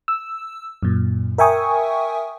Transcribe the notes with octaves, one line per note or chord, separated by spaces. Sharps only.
E6
F#2 A#2
A#4 E5 G5 G#5 C#6 D#6